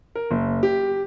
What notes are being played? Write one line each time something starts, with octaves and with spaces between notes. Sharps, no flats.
A#4
F#1
G4